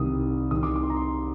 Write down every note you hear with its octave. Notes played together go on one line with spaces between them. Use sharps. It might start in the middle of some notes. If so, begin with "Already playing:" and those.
Already playing: C2 C3 D#3 D#6
C2 C3 D#3 D#6
D6
D6
C6
A#5
C6